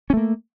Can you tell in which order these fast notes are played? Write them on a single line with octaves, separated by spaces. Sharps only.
C#4 A3 A#3